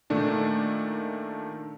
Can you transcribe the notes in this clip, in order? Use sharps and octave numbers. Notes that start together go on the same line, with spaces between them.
A#2 D#3 A3 D4 D#4